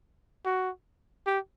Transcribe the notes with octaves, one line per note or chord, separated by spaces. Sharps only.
F#4
G4